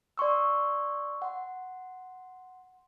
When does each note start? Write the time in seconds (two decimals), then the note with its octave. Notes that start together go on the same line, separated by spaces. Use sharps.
0.17 D5 C6 C#6 E6
1.22 F#5 C6